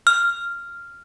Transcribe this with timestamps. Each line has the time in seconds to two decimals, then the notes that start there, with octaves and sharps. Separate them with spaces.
0.07 F6